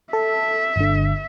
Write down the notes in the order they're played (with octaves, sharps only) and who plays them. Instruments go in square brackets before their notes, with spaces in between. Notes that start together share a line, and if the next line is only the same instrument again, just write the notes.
[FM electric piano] A4 [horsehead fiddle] E5
[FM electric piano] G1 D3